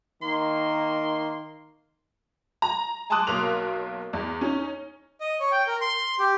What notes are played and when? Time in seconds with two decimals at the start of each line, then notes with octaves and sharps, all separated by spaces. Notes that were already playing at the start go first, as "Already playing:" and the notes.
0.22 D#3 A#3 C6
2.62 A#5
3.10 G#5 A5 C6 D6 D#6 F#6
3.27 B1 F#3 A#3 A#4 C6 F7
4.13 E2
4.41 C#4 D#4
5.21 D#5
5.40 C#5
5.52 G5
5.67 A#4
5.81 C6
6.19 G4